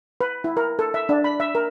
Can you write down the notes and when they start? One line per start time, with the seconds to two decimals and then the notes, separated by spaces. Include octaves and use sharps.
0.21 B4
0.44 E4
0.57 A#4
0.79 A4
0.94 E5
1.09 D4
1.24 B5
1.40 E5
1.55 A#4